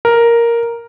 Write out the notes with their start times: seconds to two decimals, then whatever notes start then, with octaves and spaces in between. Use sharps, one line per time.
0.05 A#4